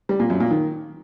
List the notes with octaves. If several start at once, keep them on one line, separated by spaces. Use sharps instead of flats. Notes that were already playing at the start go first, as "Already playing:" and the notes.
G3
A#2
F#2
A#2
D#3